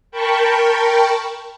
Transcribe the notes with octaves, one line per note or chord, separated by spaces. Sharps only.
A#4 G5 A5 B5 C#6